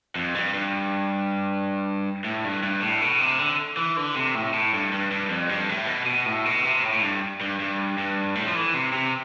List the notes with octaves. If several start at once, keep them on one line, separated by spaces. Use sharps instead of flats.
F2
G2
G2
A2
G2
G2
A2
B2
C3
D3
E3
D3
C3
A2
A2
G2
G2
G2
F2
G2
A2
B2
B2
A2
B2
C3
A2
A2
G2
G2
G2
G2
A2
F3
E3
C3
C3